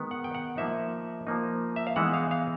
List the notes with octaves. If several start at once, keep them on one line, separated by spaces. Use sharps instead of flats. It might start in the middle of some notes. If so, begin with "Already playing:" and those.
Already playing: D#3 G#3 B3
F#5
G5
F#5
F3 A#3 D#4 E5
F3 A#3 D#4
E5
F5
E3 G#3 B3 D#4 F#5
F5
F5